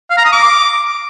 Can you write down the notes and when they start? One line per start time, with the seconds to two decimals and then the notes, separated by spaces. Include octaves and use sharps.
0.10 F5
0.17 A#5
0.25 D#6
0.32 D6